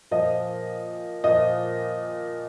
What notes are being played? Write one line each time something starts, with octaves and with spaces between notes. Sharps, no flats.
A#2 F3 D#5
A#2 F3 D#5